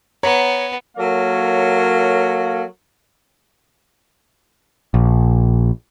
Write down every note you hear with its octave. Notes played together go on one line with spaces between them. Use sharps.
B3 C#5 A#5
F#3 A#3 A4 A#4 C#5 F5
A#1